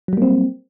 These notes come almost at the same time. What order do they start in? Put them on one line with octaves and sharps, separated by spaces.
F#3 G3 A#3 C4